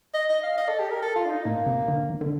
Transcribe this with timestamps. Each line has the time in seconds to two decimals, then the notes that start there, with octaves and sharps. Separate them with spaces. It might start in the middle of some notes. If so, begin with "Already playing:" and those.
0.14 D#5
0.29 D#5
0.43 F5
0.57 D#5
0.68 A4
0.79 G4
0.90 A#4
1.02 A4
1.16 F4
1.26 D4
1.30 D#4
1.45 A2 A#3
1.67 C3
1.88 D3
2.10 D#3
2.21 D3